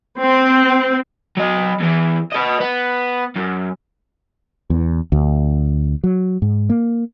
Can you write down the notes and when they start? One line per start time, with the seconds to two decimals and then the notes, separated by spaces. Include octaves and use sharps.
0.20 C4
1.37 F#3 D#5
1.80 E2 E3
2.32 B4 D#5
2.60 B3
3.36 F#2
4.70 E2
5.12 D2
6.04 F#3
6.42 G#2
6.70 A#3